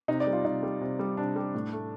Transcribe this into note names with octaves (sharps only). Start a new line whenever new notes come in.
C3 D#4
D5
G3
F4
C3 D#4
G3
C3
G3
C3 D4
G3
A2
A3